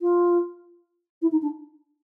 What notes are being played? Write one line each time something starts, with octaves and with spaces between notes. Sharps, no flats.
F4
E4
D#4
D4